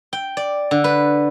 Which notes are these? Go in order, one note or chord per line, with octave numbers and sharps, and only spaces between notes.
G5
D5
D3
B4